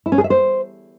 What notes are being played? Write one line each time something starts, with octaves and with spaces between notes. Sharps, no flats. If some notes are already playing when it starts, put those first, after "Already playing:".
E4
C#4
G#4
E5
C5